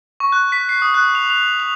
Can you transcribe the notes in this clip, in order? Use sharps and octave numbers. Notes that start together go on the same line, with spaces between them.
C#6
F#6
B6
C7
D#6
F#6
F7
F7
F7